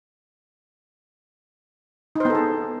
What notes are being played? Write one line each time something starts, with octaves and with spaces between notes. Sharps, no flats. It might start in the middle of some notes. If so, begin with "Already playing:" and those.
B3 D#4 G#4 A4 C5